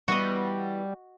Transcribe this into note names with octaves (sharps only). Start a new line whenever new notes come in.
E3 G3 B3 F#4 D#5